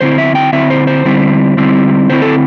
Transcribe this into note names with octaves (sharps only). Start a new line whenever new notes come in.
D3 C4 E4 C5
E5
G5
D3 C4 E4 E5
C5
C5
D3 G3 C4 E4
D3 G3 C4 E4
D3 C4 E4 C5
A4